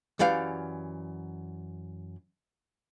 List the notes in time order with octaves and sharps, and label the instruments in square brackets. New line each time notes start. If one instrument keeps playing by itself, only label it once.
[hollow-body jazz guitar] F#2 E3 G4 D5 F5